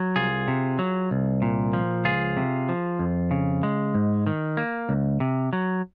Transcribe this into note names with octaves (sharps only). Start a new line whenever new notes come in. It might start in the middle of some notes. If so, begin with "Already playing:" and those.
Already playing: F#3
C2 F4 G#4
C3
F#3
C2
A#2
F3
C#2 F4 G#4
C3
F3
F2
C#3
G#3
G#2
D#3
A#3
C#2
C3
F#3